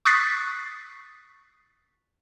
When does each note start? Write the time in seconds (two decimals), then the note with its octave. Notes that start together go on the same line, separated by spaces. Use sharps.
0.05 C#6 D#6 F#6 A6 B6 C7